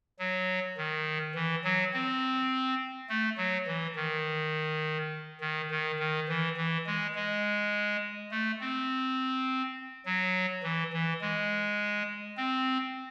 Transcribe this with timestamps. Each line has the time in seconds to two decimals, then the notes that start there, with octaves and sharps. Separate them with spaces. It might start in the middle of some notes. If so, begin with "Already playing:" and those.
0.19 F#3
0.77 D#3
1.35 E3
1.64 F#3
1.93 C4
3.09 A3
3.37 F#3
3.67 E3
3.95 D#3
5.41 D#3
5.71 D#3
5.99 D#3
6.28 E3
6.57 E3
6.86 G#3
7.15 G#3
8.31 A3
8.61 C4
10.06 F#3
10.63 E3
10.93 E3
11.21 G#3
12.37 C4